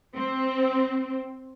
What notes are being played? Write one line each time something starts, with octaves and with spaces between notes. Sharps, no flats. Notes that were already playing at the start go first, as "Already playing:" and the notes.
C4